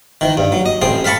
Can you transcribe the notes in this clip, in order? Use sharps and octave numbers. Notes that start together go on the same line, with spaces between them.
D#3 E3
G2
F#3
D#5
A1 C4 G#4
E5 F5 A5 B5 C#6